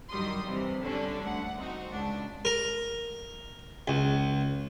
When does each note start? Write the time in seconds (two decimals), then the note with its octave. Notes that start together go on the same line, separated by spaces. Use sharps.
0.10 G2 D#3 F#3 G3 C6 D#6
0.44 G2 C3 E3
0.81 D3 G3 C#4 D4
1.25 D2 F#5
1.59 C4 D#4 F#4
1.91 C#2 D4
2.45 A#4
3.88 C#2